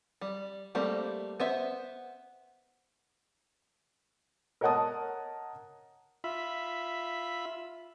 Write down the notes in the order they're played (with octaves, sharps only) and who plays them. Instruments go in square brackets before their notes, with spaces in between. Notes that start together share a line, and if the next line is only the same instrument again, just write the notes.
[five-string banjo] G3
G3 A3 A#3 C4 C5
B3 C5 E5
[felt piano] A#4 C#5 D#5 F#5 A5 D#6
[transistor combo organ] F4 E5 B5